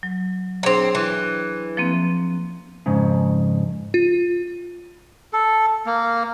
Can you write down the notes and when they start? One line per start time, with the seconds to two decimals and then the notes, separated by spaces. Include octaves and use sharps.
0.03 F#3
0.63 A#3 C4 D4 G#4 C#5
0.95 E3
1.77 F3 A#3 C4
2.86 F2 G#2 C#3
3.94 F4
5.33 A4
5.86 A#3